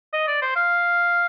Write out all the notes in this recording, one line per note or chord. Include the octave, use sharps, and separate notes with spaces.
D#5
D5
C5
F5